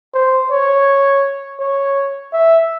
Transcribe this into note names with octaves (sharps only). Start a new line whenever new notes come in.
C5
C#5
C#5
E5